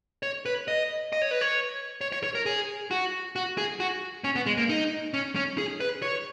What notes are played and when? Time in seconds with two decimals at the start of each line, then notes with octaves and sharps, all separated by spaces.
0.23 C#5
0.46 B4
0.68 D#5
1.13 D#5
1.22 C#5
1.31 B4
1.41 C#5
2.01 C#5
2.12 C#5
2.24 C#5
2.35 A#4
2.46 G#4
2.91 F#4
3.36 F#4
3.58 G#4
3.80 F#4
4.24 C#4
4.36 B3
4.46 G#3
4.58 A#3
4.69 D#4
5.14 C#4
5.36 C#4
5.58 G#4
5.80 B4
6.02 C#5